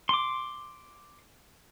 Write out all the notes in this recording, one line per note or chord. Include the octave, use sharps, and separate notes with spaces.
C6 D6